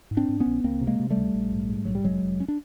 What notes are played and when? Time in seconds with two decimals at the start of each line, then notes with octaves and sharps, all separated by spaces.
0.11 G#2
0.17 C4 D4
0.28 G#2
0.40 B3 C#4
0.46 A#1
0.64 C#2 A#3 C4
0.81 C3
0.87 G#3 A#3
1.00 C3
1.10 G3 A3
1.17 C#2
1.35 A#1
1.52 G#2
1.69 G#2
1.85 A#1 F#3
1.95 G3
2.04 F1 F#3 G#3
2.23 F1
2.40 C#4
2.48 D4